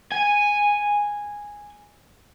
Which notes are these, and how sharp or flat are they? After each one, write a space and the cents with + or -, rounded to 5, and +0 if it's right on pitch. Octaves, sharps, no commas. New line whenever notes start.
G#5 -10